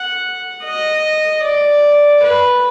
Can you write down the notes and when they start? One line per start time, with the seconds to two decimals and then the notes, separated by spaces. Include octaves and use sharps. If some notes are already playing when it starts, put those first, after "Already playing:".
Already playing: F#5
0.64 D#5
1.44 D5
2.24 B4